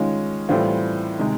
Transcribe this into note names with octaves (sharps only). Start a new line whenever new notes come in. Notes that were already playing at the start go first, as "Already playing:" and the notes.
Already playing: D#3 G#3 C#4 F4
A2 E3 G3 C4 F4
C3 D#3 G#3